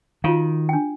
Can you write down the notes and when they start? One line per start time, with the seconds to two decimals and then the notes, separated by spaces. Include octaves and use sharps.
0.24 D#3 F4 F#4 F5
0.69 D4 G5